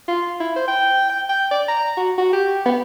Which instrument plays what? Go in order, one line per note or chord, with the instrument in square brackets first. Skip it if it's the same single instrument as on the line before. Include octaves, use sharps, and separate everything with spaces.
[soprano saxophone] F4
E4
C5
G5
G5
G5
D5
A#5
F#4
F#4
G4
B3